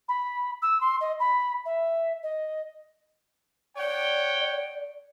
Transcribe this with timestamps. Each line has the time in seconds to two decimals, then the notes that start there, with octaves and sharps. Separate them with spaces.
0.08 B5
0.62 E6
0.81 C6
1.00 D#5
1.20 B5
1.65 E5
2.23 D#5
3.77 C#5 D5 F#5 G5